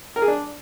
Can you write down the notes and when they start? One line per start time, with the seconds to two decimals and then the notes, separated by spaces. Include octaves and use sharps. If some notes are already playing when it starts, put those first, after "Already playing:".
0.16 A#4
0.22 G#4
0.28 D4